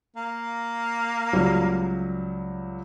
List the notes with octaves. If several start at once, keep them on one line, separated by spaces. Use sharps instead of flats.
A#3
C#2 F#3 G3